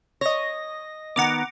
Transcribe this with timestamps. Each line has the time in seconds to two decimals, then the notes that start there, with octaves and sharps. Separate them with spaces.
0.21 C#5 D#5 A#6
1.16 D#3 B3 F#5 A#5 D6